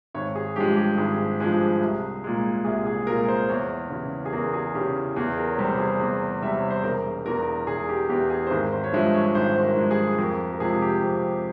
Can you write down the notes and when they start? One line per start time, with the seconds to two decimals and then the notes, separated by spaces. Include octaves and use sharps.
0.15 G#1 C#5
0.35 G#4
0.56 G2 F3 G#3 G4
0.68 G#4
0.76 G4
0.97 G#1 G#4
1.40 G2 F3 G#3 G#4
1.81 C2
2.24 A#2 G#3
2.65 C2 G#4
2.87 G#4
3.07 A#2 G#3 A#4
3.28 C5
3.49 E2 C#5
3.90 C#3 E3
4.26 G#4
4.33 E2 A#4
4.54 G#4
4.74 C#3 E3 G4
5.16 E2 G#4
5.38 A#4
5.49 C#5
5.58 C3 G3 C5
5.78 G#4
6.00 E2
6.42 C3 G3 E5
6.56 C#5
6.70 C5
6.84 E1 A#4
7.26 E2 E3 A#4
7.67 E1 G#4
7.89 G4
8.09 E2 E3 G4
8.30 G#4
8.47 C5
8.51 G#1 A#4
8.72 C5
8.84 C#5
8.93 G2 F3 G#3 E5
9.14 C#5
9.35 G#1 C5
9.56 C5
9.63 A#4
9.76 G2 F3 G#3
9.91 G#4
10.18 F2 A#4
10.53 A#4
10.60 C3 F3 G#3 G#4
10.82 G4
11.03 F2